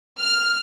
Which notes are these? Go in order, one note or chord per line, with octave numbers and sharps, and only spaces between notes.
F6